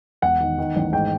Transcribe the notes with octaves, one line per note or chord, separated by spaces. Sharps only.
E1 F#5
D#3
D#3
A1
G#2 G5